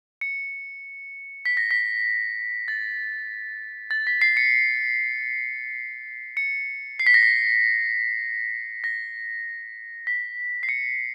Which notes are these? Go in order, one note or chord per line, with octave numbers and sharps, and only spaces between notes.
C#7
B6
A#6
B6
A6
A6
B6
C7
C#7
C#7
C7
B6
A#6
B6
A#6
B6
C7
C#7